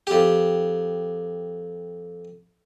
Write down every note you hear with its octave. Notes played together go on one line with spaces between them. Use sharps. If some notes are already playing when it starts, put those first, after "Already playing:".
F2 G4